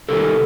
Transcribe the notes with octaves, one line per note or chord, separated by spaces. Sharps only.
C3 D#3 G3 A#3 A4